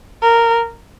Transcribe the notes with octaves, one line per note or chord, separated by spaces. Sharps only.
A#4